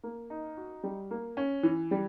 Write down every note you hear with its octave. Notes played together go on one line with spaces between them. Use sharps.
A#3
D#4
F#4
G3
A#3
C#4
E3
G3